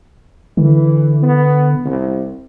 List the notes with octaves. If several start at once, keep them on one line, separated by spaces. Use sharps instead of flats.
D3 E3
B3
C2